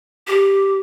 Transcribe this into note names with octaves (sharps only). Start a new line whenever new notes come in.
G4